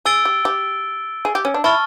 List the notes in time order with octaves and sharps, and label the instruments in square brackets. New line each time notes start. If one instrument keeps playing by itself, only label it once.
[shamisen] G#4 [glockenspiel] E6 A6 D7 G7
[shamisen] G4
G4
G#4
G4
C#4
D4
[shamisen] E4 [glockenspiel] A5 C#6 F6 A6